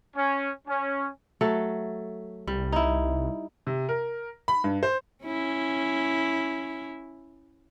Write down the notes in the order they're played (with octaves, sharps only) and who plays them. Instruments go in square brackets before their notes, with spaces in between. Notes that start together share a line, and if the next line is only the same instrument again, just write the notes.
[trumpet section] C#4
C#4
[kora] F#3 A3 A4
[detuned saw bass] C2 [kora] G3
[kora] D#4 E4
[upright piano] C3
A#4
B5
G2
C5
[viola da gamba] C#4 E4